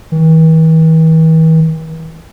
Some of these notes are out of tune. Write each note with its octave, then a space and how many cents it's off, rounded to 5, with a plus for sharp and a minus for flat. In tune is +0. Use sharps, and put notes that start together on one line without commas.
E3 -45